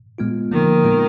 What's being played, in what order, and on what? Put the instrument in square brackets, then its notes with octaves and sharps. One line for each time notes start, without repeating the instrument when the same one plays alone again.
[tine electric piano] A#2 G#3 B3 F4
[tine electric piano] D3 F3 A#3 [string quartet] D#3
[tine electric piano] A#2 G#3 B3 F4